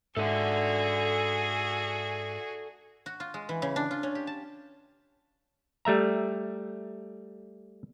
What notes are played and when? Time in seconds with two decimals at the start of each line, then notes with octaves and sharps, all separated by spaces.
0.17 G#2 D4 F#4 G#4 A4 E5 F#5
3.06 F#4
3.20 F4
3.34 G#3
3.49 E3
3.62 C#3
3.76 D4
3.91 F4
4.03 C#4
4.15 G4
4.27 A5
5.85 G3 A3 E5 A#5